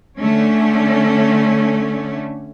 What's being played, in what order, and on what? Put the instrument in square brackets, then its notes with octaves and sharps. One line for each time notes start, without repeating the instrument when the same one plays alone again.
[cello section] D3 A3 C#4